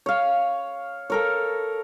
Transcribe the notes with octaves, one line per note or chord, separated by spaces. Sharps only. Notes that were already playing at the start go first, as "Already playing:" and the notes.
C#5 F5
A4 A#4 C#5